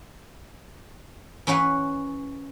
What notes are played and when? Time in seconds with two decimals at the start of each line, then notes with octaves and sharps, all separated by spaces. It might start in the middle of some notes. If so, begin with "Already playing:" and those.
1.47 E3 C#4 B4 F#5